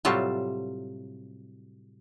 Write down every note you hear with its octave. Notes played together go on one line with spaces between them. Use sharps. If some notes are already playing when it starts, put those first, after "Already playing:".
A2 C3 F#3 G3 F4 A5